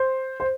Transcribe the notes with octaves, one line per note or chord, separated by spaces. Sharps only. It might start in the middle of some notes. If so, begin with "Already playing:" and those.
Already playing: C5
C5